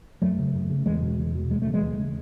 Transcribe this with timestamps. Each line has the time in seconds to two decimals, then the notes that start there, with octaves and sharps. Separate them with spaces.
0.22 F#2 F#3 A3
0.39 C#3
0.55 F#2
0.70 C#3
0.86 E2 E3 G#3
1.02 B2
1.19 E2
1.35 B2
1.50 D#2 G#3
1.62 A3
1.67 C#3
1.74 E3 G#3
1.83 D#2
1.99 C#3